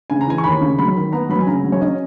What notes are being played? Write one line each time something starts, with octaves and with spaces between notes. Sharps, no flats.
C#3 G#5
A#5
E3 G#5
C#6
D#2 B5
C#3
F#3 B5
D#3
B3 A#5
F#3 B5
G#5
C#3 A#5
F#3
C#5
C#4 D#5